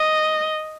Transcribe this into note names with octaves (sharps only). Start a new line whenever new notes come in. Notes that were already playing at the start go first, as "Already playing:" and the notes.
Already playing: D#5